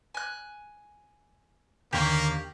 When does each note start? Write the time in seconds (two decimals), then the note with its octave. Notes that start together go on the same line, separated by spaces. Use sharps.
0.14 G#5 F#6
1.93 D#2 D3 A#3 G4 F5 C#6